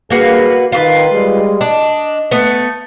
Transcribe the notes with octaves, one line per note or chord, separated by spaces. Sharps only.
G2 A#3 F#4 G#4 B4
D#3 F4 F#4 B4
G3 G#3
D4 D#5
A3 B3